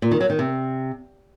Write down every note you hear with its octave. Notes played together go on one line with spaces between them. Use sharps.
A#2
D#3
F#3
D#3
C3